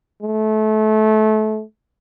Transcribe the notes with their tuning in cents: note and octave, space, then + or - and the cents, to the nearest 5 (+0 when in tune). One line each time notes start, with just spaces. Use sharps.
A3 -25